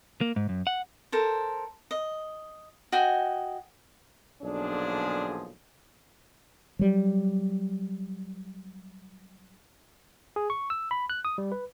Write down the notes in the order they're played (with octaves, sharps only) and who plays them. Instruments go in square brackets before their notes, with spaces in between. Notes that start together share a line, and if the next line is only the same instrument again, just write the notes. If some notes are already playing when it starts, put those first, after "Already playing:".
[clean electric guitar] A#3
G#2
F#2
F#5
[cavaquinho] A4 A#4 C5
D#5
F#4 D#5 G5 G#5
[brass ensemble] B1 A#2 D3 F3 D4 G#4
[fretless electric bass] F#3 G3
[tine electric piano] G#4
C#6
E6
B5
F#6
D#6
G3
B4